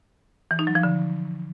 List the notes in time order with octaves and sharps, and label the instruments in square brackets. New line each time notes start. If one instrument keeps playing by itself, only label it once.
[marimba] E3
D#4
F#3
F3
D3